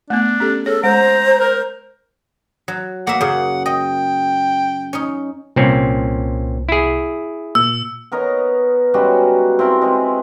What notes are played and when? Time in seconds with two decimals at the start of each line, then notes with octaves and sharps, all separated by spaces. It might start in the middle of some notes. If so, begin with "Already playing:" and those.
0.10 A3 B3 D4
0.40 C#4 G4 A4
0.66 G#4 A4 C#5
0.83 G#3 C5 A#5
1.40 A#4
2.68 F#3
3.07 A#3 E5 F#5
3.21 F#2 C#3
3.66 D#5 G5
4.93 C#4 D#4
5.56 C2 A#2 C4 C#4
6.69 E4 G#4
7.55 A#2 E6
8.12 B3 A#4 C#5 D#5
8.94 C#3 G3 G#3 F#4
9.59 C4 E4 A#4
9.81 G#3 C4 B4